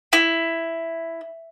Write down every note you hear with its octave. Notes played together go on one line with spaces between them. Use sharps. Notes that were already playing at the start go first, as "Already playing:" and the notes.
E4